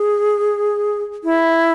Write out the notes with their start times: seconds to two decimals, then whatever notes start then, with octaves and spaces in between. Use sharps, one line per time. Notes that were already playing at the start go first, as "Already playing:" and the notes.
Already playing: G#4
1.24 E4